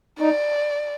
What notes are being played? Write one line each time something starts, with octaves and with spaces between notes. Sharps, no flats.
D#4 D5